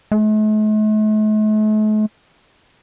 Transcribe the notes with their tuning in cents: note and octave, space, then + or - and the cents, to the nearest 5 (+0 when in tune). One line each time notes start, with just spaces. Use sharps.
A3 -45